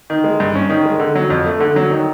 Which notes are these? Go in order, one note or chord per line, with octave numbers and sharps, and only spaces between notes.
D#3
G#3
G2
C#4
D#3
G#3
D3
F#3
F2
A3
D3
F#3
D#3